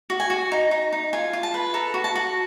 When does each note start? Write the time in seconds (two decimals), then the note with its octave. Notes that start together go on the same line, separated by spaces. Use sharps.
0.10 F#4
0.20 G#5
0.30 F#4
0.52 D#4
0.71 D#4
0.92 D#4
1.13 F4 G#5
1.33 F4
1.43 A5
1.54 B4
1.74 A4 A#5
1.94 F#4
2.04 A5
2.16 F#4